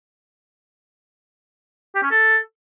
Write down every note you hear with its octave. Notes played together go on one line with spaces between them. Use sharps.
G4
C#4
A4